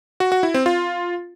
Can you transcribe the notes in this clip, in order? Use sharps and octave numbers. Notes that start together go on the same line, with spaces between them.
F#4
F#4
E4
C4
F4